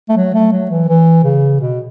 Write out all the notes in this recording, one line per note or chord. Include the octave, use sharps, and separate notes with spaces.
A3
F#3
A3
F#3
E3
E3
C#3
B2